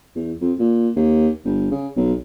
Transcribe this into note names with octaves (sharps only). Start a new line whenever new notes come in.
E2
F2
A#2
D#2
G1
C#3
B1